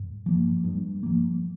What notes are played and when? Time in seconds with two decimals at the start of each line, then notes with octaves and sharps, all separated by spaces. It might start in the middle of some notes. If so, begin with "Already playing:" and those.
Already playing: G2
0.26 F3 A#3
0.64 G2
1.03 F3 A#3